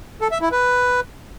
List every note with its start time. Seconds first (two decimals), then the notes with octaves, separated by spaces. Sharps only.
0.21 A4
0.31 E5
0.42 E4
0.52 B4